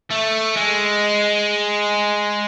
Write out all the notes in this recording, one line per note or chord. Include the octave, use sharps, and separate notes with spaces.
A3
G#3